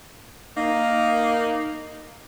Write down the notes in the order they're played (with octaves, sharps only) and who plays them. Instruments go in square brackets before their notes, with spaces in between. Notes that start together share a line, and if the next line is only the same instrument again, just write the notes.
[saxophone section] A#3 D#4